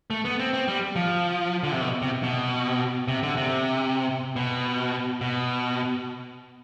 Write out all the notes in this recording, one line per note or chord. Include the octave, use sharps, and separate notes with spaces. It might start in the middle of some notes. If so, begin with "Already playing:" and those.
A3
B3
C4
C4
G3
F3
D3
C3
B2
C3
B2
C3
D3
C3
B2
B2